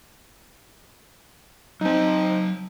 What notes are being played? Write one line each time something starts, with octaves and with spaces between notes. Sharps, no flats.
F#3 C4 D#4 A5